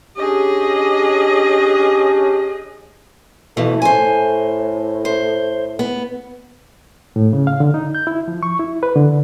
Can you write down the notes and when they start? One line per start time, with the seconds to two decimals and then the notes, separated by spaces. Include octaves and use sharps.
0.17 C#4 D4 G4 G#4 D#5
3.57 F2 B2 E3 A3
3.82 A2 C5 G#5
5.05 C5
5.79 B3
7.16 A2
7.33 C#3
7.47 F5
7.60 D3
7.74 D#4
7.95 G6
8.07 E4
8.28 F3
8.43 C#6
8.59 E4
8.83 B4
8.96 D3